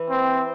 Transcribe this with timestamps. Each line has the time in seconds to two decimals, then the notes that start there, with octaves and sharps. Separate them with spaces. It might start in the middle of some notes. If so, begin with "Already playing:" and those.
Already playing: E3
0.10 C4